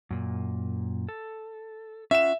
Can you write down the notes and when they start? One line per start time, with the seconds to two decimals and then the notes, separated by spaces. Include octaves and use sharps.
0.11 F#2 A#2
1.09 A4
2.11 C#4 F4 E5 F#5 E7